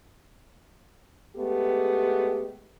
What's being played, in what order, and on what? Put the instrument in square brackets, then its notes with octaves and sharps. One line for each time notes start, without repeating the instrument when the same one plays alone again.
[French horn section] G#3 A3 B3 G4